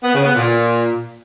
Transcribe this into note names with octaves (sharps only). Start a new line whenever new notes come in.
B3
C#3
B3
A#2